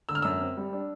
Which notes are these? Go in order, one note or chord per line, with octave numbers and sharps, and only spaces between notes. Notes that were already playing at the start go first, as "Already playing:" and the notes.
D3 E6
F6
F#2 E6
C4
G3
D4